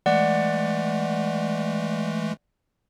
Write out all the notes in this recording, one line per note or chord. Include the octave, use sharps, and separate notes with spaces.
E3 G#3 A3 D5 F#5